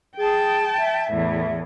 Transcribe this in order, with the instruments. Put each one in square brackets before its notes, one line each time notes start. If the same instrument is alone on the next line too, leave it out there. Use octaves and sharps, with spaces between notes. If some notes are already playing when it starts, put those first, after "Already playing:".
[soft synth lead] G#4 [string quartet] G5 A5
[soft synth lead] E5
[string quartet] E2 A2